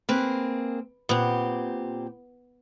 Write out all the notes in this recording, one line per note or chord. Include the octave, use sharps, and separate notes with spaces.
A#3 C4 G#4 B4
A#2 B3 C4 G4